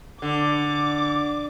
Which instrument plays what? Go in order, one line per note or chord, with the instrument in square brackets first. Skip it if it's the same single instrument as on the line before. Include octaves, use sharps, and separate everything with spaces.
[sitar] D3 [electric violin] D6